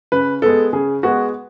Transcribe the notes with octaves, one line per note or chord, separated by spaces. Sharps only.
C#3 B4
G#3 B3 A4
C#3 G#4
G#3 B3 F#4